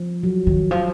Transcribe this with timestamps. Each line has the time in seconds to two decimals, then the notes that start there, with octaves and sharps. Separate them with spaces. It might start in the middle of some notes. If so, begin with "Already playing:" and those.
Already playing: F3
0.23 F#3
0.47 D#3
0.71 F3